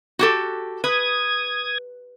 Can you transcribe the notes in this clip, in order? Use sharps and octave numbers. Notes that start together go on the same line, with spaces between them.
F#4 G4 A4
B4 D#6 G#6